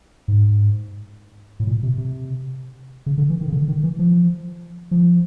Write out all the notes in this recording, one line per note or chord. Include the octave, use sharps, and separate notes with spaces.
G#2
A2
A#2
C3
C3
C#3
D3
E3
D#3
C#3
D3
D#3
E3
F3
F3